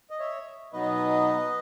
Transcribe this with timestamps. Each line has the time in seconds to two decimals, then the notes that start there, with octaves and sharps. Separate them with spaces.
0.10 D#5
0.19 C#5 E5
0.73 B2 F#3 B3 D#4 B4 D#5